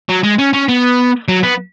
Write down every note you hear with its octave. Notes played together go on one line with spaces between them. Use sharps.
F#3
G#3
C#4
C#4
B3
F#3
B3